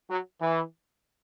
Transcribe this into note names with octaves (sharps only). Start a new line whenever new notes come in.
F#3
E3